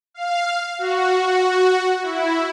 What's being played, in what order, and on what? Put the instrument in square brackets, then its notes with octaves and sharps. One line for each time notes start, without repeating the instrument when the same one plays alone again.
[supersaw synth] F5
F#4
E4